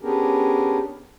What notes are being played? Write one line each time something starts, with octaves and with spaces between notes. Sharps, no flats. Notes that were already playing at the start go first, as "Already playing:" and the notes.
B3 C#4 D4 G4 G#4 A#4